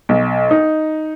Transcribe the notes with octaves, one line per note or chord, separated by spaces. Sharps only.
B1
D#4